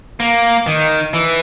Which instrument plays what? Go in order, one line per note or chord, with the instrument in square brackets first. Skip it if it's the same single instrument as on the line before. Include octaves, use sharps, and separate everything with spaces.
[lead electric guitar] A#3
D#3
E3